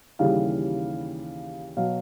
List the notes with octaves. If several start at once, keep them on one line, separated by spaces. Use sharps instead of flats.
D#2 C#3 E3 G3 F5
B2 F#3 F5